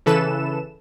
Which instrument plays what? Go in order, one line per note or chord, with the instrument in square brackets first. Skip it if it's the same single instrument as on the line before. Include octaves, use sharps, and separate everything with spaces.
[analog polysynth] C#3 E3 A4 B4 E7